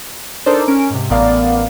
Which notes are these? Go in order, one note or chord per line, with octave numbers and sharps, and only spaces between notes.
D4 D#4 A4 A#4 C5 D5
C#4 A#4 D7
G#2 C3
A1 B3 A#4 D5 F5